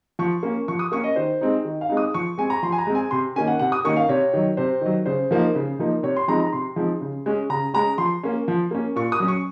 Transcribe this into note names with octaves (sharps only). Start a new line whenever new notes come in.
F3 C#6
A#3 C#4
F3 C#6
D#6
A#3 C#4 C#6
D#5
D#3 C5
G#3 C4 D#4
D#3
F5
G#3 C4 D#4
D#6
F3 C#6
G#3 C4 G#5
A#5
F3 C6
G#5
A#5
G#3 C4
G#5
C3 C6
D#3 A#3 C#4 G#5
F#5
C3 F#5
D#6
D#3 A#3 C#4 C#6
F5
C3 C#5
D#3 F#3
C3 C5
D#3 F#3
C#3 C5
F3 A#3 D#4
C#3
F3 A#3 D#4
C3 C#5
C6
F3 G#3 C4 D#4 A#5
A#5
C3 C6
F3 G#3 C4 D#4
C#3
G#3 C#4
C#3 A#5
G#3 C#4 A#5
F3 C6
A#3 C#4
F3
A#3 C#4
A#2 C#6
D#6
F#3 C#4
C#6